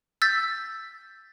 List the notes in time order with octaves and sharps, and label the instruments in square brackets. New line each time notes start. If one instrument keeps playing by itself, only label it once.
[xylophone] E6 G6 A6 B6